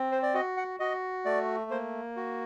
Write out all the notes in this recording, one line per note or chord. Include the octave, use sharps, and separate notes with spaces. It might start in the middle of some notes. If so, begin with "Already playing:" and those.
Already playing: C4
C5
D5
F#4 D#5
F#5
F#4 D#5
A3 D5
A#3 C5
F#4